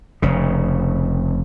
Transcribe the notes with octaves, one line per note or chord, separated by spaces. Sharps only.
F1 C#3